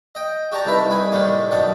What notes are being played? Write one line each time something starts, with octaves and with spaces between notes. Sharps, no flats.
D#5 G5
F#4 G4 D5 A5 A#5
C2 D#3 E4 B4 E5
C2 D#4 G#5 B5
A2 C3 D#3 A3 A#3 D4
F#2 B2 D#3 D5 F#5